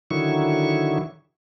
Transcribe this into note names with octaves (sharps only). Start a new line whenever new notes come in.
D3 D#3 F#3 E4 C#6